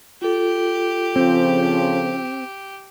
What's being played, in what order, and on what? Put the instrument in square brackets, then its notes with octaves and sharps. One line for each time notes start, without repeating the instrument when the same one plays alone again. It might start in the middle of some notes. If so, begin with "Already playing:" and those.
[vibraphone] F4 A4 [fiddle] G4
[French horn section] C#3 F3 [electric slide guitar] C4